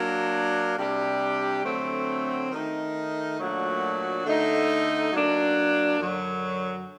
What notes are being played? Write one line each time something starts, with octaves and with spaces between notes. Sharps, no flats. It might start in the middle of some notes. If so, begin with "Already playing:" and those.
Already playing: F#3 A#3 D4
C3 G3 D4 G4
D3 F#3 A3 C4
D#3 A3 D#4
A#2 F#3 A3 D4 F#4
D3 A3 D#4
F#3 A#3 D4
F#2 D3 F#3